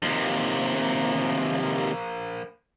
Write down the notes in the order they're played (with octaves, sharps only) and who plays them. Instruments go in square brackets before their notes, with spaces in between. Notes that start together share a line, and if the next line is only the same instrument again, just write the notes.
[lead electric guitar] D#2 C3 [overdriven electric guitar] F3 A#3